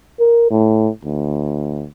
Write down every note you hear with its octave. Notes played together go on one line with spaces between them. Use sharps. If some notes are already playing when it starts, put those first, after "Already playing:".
A#4
A2
D2